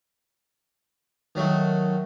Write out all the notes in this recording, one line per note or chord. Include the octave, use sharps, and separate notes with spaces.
D#3 F#3 A3